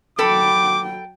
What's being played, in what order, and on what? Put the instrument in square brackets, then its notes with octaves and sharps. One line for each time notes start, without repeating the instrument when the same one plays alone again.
[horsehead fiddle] F#3 G5 [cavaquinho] A4 B5 [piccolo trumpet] D6